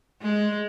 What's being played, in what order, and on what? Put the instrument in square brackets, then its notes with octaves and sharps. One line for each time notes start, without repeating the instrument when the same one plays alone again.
[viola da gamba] G#3